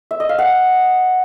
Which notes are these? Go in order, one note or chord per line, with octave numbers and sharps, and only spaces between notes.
E5
D#5
F5
F#5